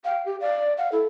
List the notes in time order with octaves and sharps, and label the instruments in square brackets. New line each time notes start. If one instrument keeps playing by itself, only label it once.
[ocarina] F5 [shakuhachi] G5
[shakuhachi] G4
[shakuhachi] D5 [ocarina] F5
[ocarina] F5 [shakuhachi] F#5
[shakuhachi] E4 [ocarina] A4